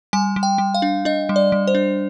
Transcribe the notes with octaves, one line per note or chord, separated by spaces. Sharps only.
G3 G#5
G3
G5
G3
F5
D4
D4 D#5
G3
D5
G3
C5
D4